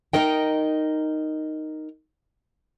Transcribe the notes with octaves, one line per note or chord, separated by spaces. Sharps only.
D#4 A#4 D#5 G5